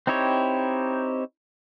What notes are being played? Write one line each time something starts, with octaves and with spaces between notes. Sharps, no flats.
C4 D#4 E4 G4 C#5